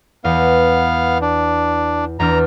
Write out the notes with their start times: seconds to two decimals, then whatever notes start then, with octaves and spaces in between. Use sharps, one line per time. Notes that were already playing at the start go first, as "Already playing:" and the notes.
0.24 E2 B3 F5
1.22 D4
2.20 E2 D4 A#5 F6